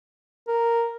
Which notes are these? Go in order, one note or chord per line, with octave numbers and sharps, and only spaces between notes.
A#4